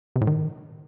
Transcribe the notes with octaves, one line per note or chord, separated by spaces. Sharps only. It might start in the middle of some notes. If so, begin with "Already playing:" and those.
C3
A2
D#3